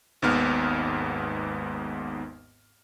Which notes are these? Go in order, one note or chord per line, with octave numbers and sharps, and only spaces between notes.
G#1 D#2 G#2 B3 F6